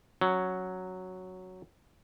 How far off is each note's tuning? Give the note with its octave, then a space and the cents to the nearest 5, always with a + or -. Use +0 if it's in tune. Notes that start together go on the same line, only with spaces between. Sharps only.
F#3 +0 C#4 +0